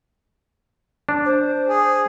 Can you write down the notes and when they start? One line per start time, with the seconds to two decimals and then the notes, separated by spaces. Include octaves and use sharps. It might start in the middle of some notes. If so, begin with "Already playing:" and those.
1.09 D4
1.25 C5
1.67 G#4